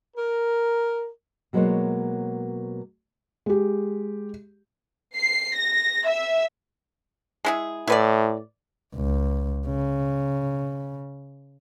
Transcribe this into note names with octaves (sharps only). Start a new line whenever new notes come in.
A#4
B2 F#3 G#3 A#3 C5 C#5
G#3 G4
C7
A#6
E5
G#3 E4 G#4
A2 E4 B4 D5
C#2
C#3